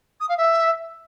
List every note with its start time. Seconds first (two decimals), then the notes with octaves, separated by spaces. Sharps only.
0.20 D#6
0.29 F5
0.37 E5